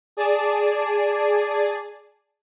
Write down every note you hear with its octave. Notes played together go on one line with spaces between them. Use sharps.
G#4 D5 A5